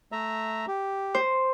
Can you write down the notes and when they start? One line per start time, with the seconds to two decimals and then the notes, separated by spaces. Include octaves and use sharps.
0.12 A3 E5 A#5
0.68 G4
1.14 C5